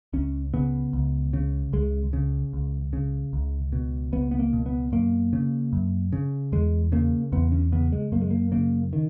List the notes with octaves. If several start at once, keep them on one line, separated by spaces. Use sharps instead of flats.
C#2 C#4
C#3 B3
C#2
C#3
C#2 G#3
C#3
C#2
C#3
C#2
B2
C#2 B3
B3
A#3
B2
B3
F#2 A#3
C#3
F#2
C#3
E2 G#3
C#3 A#3
E2 B3
C#4
C#3 B3
G#3
F#2 A#3
G#3
A#3
C#3 A#3
D#3